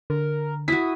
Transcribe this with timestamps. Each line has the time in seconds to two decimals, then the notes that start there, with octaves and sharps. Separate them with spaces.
0.10 D3 A#4
0.68 E4 F#4 D#6 B6